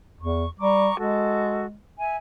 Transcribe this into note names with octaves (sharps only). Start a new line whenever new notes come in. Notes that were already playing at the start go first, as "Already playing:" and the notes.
E2 C#6
G3 A#5 C#6 D6
G#3 F#4 A4
E5 G#5